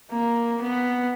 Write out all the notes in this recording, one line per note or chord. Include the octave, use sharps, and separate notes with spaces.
A#3
B3